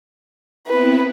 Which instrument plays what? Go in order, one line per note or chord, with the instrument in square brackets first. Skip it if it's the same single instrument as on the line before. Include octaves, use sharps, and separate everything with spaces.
[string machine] B3 C4 E4 [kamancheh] B4